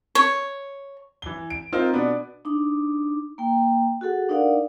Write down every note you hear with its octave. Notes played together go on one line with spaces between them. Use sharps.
C#5
E3 G7
D7
C4 D#4 F4 A#4 C5
B2 B3 D4
D4 D#4 D6
A#3 G5
F#4 G#4 A4 F#5
D4 D#4 A#4 D5 F5 F#5